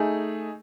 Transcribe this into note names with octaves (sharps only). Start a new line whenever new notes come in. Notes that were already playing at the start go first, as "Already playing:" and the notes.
Already playing: A3 D#4 G#4